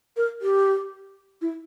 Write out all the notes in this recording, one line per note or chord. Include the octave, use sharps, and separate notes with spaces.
A#4
G4
E4